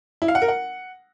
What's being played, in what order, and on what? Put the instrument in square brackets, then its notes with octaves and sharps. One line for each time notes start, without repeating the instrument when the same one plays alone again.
[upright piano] E4
F5
F#5
A#4
F#5